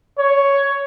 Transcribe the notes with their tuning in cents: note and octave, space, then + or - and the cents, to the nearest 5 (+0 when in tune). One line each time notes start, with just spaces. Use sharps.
C#5 +5